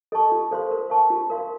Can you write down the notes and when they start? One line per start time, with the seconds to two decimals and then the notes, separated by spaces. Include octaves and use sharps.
0.12 A4 D#5 A5 C#6
0.32 F4
0.51 A4 C5 F5 C6
0.71 A#4
0.90 F5 A5 C#6
1.10 F4
1.30 A#4 F5 C6